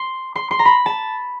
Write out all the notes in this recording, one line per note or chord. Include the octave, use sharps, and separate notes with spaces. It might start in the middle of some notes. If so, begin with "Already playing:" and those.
Already playing: C6
C6
C6
A#5
B5
A5